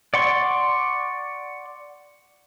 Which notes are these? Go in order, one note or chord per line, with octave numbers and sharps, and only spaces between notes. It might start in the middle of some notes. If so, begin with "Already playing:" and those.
D5 F#5 C6 C#6